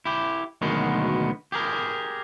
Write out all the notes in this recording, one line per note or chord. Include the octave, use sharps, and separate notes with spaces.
E4 G4
D2 B2 D#3 F#3 G#3 B3
G4 G#4 A#4